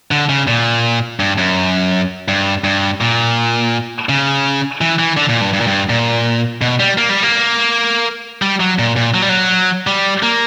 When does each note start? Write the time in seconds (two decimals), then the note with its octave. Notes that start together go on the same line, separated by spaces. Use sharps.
0.11 D3
0.29 C#3
0.47 A#2
1.20 G2
1.38 F#2
2.28 G2
2.64 G2
3.01 A#2
4.09 C#3
4.81 E3
4.99 E3
5.17 D3
5.29 A#2
5.41 G2
5.53 G2
5.60 A#2
5.67 G2
5.89 A#2
6.62 B2
6.80 G3
6.98 A#3
7.10 G3
7.23 A#3
8.42 G3
8.60 F#3
8.79 A#2
8.96 A#2
9.14 F#3
9.22 G3
9.29 F#3
9.87 G3
10.23 A#3